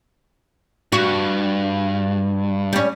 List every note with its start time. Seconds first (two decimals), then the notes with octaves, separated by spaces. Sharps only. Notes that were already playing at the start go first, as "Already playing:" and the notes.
0.92 G2 F#4
2.73 G3 C#4